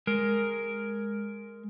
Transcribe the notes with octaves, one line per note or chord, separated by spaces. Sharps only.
G#3 A#4